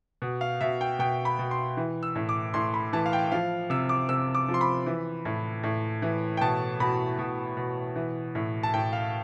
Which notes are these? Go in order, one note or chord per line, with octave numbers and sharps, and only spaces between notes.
B2
F5
B2 E5
G5
B2 G5
B5
B2
C6
E3
E6
A2
D6
A2 C6
B5
E3 A5
F5
G5
F3 F5
C3 E6
D6
C3 E6
D6
F3
C6
B5
E3
A2
A2
E3
G5
B2 A5
B2 B5
B2
B2
E3
A2
A5
A2 G5
F5